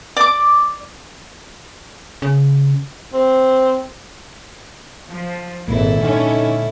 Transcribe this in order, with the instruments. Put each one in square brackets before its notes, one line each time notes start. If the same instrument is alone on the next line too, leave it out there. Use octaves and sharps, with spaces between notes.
[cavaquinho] D5 D6
[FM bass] C#3
[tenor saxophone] C4
[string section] F3
[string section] G#1 [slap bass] A#2 G#3 [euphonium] A#3 [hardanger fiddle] E4 A4
[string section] D3 C#4 [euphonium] D#4